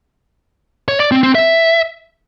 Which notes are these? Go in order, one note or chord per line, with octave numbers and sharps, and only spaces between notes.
C#5
D5
C4
C4
E5